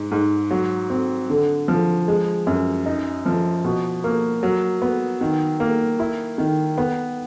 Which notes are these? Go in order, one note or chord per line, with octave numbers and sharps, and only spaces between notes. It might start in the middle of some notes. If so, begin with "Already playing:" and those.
Already playing: G#2
G#2
F#3
C4
D3
F3
G#3
F#2
D#4
F3
B2
A#3
F#3
B3
D#3
A#3
E4
D#3
B3